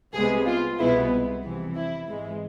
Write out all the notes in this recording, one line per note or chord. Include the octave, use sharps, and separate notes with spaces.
C2 C3 G#3 B3 G#4
F4
C2 B2 G#3 B3 E4
F2 C3 E3
E4
G#1 G#2 E3 G#3